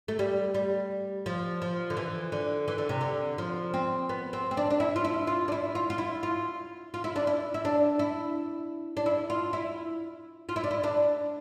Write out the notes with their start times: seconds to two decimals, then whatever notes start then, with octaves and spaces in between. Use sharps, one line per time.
0.08 A3
0.19 G3
0.55 G3
1.26 F3
1.62 F3
1.90 D3
1.97 E3
2.32 D3
2.68 E3
2.78 D3
2.89 C3
3.01 D3
3.38 F3
3.74 C4
4.09 B3
4.33 C4
4.51 C4
4.57 D4
4.71 D4
4.80 E4
4.96 F4
5.04 E4
5.27 F4
5.48 D4
5.52 E4
5.75 F4
5.90 F4
5.98 E4
6.23 F4
6.94 F4
7.04 E4
7.16 D4
7.27 E4
7.54 E4
7.65 D4
7.99 E4
8.97 D4
9.06 E4
9.30 F4
9.53 E4
10.49 F4
10.56 E4
10.64 D4
10.71 E4
10.84 D4